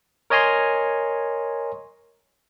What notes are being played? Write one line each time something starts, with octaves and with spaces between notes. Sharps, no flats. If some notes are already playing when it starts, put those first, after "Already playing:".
A#4 C#5 D#5 G#5 A#5 C6